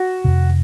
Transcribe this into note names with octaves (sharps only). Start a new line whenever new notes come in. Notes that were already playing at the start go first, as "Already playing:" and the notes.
Already playing: F#4
F2 C3 D#3